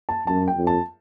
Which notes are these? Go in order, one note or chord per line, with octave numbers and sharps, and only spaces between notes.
A5
F#2 A5
G5
F2
A5